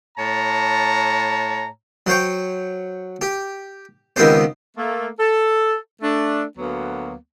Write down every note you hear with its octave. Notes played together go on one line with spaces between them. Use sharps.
A2 C#5 A5 A#5
F#3 C5 C#5 G5
G4
C#2 D#3 B3 C4 G4 C5
A3 A#3
A4
A3 D4
D2 F#3 A#3 B3